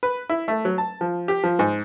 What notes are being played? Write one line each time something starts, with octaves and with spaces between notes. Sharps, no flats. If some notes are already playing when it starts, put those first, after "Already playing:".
B4
E4
A3
F#3
A5
F3
G4
F3
G#2